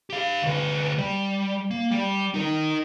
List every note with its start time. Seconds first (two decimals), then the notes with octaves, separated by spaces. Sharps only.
0.10 G4 F5
0.42 D2 B4
0.98 G3
1.71 A#3
1.91 G3
2.34 D#4 A#4